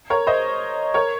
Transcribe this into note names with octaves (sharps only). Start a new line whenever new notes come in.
A#4 C#5
C5 D#5
A#4 C#5